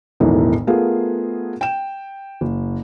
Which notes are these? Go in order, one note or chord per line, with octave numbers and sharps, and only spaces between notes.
E1 B1 A2 D#3 E3 D#4
A3 B3 F4 G#4 A#4 F5
G5 E7
F#1